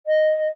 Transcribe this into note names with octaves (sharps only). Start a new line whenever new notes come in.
D#5